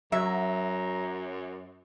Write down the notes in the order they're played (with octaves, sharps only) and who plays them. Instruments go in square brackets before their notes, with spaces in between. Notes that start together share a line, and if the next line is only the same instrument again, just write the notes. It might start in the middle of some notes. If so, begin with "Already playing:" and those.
[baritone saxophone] F#2 [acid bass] F#3 [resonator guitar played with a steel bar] E5 [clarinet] A#5